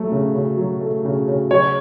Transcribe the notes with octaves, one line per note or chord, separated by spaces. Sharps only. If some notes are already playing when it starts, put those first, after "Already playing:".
Already playing: F#3 A3
C#3
C#3
F#3
A3
C#3
C#3
F#3 C#5